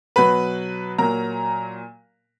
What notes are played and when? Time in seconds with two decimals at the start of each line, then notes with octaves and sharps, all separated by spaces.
0.16 B2 F#3 B4 B5
0.98 A#2 F#3 A#4 A#5